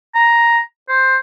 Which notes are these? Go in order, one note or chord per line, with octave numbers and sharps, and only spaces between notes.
A#5
C5